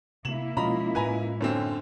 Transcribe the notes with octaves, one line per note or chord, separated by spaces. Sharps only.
C3 A#3 E4 E7 F#7
B2 F3 G#3 C#4 F4 D#5 A#5 B5
A2 G#3 B4 G#5 A#5
F#2 D3 C4 C#5